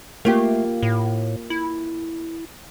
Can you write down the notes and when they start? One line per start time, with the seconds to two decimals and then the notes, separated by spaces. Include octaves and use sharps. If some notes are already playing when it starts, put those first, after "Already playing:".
0.25 A3 A#3 F4 G4
0.83 A2
1.50 E4